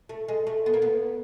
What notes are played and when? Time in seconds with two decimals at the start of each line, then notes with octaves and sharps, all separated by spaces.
0.09 A3
0.28 G#3
0.47 A3
0.66 B3
0.74 A#3
0.82 B3